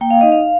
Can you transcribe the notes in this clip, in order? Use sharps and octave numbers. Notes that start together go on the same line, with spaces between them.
A#3 G5
F5
D#4 D#5
F5